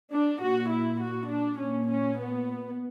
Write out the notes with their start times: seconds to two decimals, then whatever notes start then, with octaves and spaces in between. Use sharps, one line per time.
0.12 D4
0.41 A#2 F#4
0.70 E4
1.01 F#4
1.29 D4
1.59 A#2 C#4
1.89 C#4
2.19 B3